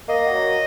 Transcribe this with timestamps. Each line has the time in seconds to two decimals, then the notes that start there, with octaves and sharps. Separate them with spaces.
0.08 A#3 D#5
0.25 F#3